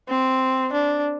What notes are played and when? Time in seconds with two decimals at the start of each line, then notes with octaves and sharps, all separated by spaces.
0.09 C4
0.73 D4